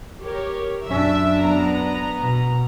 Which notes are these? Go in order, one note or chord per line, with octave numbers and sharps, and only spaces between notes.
G4 A#4 C#5
F#2 D4 E5
B3 A#5
B2